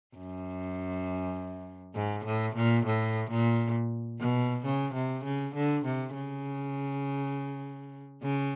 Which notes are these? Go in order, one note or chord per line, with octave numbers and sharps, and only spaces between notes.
F#2
G#2
A2
A#2
A2
A#2
B2
C#3
C3
C#3
D3
C3
C#3
C#3